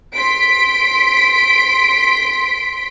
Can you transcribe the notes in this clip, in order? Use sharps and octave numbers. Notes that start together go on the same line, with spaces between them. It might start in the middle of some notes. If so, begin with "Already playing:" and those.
C6 B6 D7